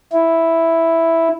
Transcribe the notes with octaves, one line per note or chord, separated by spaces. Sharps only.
E4